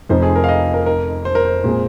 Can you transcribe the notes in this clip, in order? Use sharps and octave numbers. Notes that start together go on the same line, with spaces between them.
F1 F2 F3 C4 D#4 C5
G#4
A#4
F5
D#5
A#4
A#4
C5
A#4
C5
A#2 G#3 C4 G#4